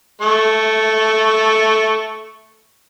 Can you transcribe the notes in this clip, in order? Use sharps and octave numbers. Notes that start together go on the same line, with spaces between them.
A3 C#6